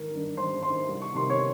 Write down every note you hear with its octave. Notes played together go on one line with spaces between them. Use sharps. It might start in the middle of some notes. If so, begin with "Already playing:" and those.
Already playing: G#1 A#4
G2 D#3
G#1 C5 C6
G2 D#3 C5 C6
C2
C#6
C3 D#3 C6
C#5 C#6